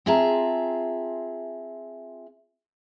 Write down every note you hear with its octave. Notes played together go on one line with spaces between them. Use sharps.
C4 F4 G#4 E5 A5 A#5